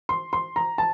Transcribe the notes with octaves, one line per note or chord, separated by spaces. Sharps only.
C6
C6
A#5
A5